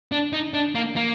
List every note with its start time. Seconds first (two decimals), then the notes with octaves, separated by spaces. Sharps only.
0.12 D4
0.33 D#4
0.54 D4
0.75 A#3
0.96 A#3